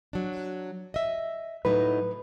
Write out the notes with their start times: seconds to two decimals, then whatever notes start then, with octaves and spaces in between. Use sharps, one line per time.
0.13 F#3 D4
0.94 D#5 E5
1.65 A2 F#3 D#4 B4